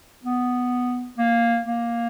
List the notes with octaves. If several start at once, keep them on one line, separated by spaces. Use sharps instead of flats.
B3
A#3
A#3